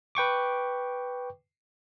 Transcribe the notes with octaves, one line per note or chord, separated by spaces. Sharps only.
B4 G5 C#6 D6